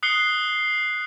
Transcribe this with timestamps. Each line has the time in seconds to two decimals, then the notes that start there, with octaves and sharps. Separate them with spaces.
0.03 D#6 F#6 C7 C#7 G7